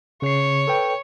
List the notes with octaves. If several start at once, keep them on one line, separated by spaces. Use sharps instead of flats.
C#3 C#5 C7
A4 B4 G5